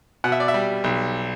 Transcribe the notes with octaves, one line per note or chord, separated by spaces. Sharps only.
B2 F#5
E5
D5
E5
G3
B1